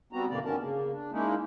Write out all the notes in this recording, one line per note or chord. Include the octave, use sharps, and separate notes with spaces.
G3 B3 C4 F#4 A#5
F2 B2 D3 E3 A#3 D5
G2 D#3 B3 C#4 A#4 A5
C#3 A#3
D4
G#3 A#3 C#4 D#4 E4